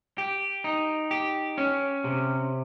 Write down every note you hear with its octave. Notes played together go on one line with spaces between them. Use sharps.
G4
D#4
G4
C#4
C3